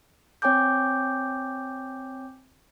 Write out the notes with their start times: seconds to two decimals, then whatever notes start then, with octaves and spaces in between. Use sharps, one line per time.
0.42 C4 C#5 G5 G#5 D6 G6